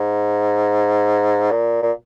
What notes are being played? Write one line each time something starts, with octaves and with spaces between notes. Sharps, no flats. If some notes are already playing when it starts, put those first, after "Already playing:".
Already playing: G#2
A#2
A#2